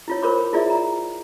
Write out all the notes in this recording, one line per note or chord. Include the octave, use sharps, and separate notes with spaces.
E4 F4 C#5
A#4 C5 C#5 B5 D6
E4 F4 G#4 D5 E5
A#5